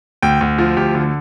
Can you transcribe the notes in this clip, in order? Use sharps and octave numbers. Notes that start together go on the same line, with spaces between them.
D2 G5
D2
F3
D2 G4
D3